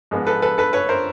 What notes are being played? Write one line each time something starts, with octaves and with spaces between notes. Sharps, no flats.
G#2 F3 G#3 B3
A4 B4
A4 B4
A4 B4
B4 C#5
A#4 C5